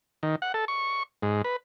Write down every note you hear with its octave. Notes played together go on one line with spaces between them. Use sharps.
D#3
F#5
A4
C#6
G#2
B4